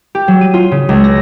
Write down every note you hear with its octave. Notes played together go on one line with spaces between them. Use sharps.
G4
F#3
D#7
F4
C#3
C#2
A#6